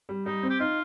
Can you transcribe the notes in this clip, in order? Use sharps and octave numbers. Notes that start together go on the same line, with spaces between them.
G3
G3 D#4
C4
G4
D#4 F4